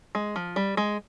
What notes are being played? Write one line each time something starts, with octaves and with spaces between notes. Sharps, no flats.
G#3
F3
G3
G#3